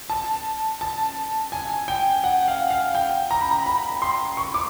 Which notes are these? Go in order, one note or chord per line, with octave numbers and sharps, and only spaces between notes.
A5
A5
G#5
G5
F#5
F5
F5
G5
A#5
B5
A#5
B5
C6
C#6
D6